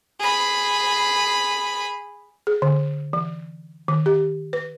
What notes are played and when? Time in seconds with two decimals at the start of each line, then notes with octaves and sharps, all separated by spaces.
0.20 G#4 B5
2.47 G#4
2.62 D3
3.13 E3
3.88 D#3
4.06 G4
4.53 B4